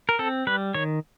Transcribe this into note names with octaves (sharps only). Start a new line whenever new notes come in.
A#4
C4 A4
G3 B4
D#3 C#5